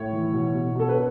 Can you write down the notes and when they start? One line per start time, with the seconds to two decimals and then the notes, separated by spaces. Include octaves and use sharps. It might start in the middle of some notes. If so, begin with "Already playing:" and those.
Already playing: A2 C#5
0.13 E3
0.33 B2
0.54 B2
0.75 B2 A4
0.89 B4